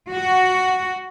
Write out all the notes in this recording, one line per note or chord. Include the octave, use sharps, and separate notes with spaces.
F#4